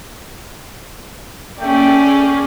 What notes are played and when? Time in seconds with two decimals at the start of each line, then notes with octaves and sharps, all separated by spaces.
1.59 A3 A#3 C#4 G#4 D5 G5